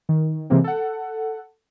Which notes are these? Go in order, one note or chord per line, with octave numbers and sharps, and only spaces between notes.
D#3
C3 E3 G#3 A#3 C4
A4 F#5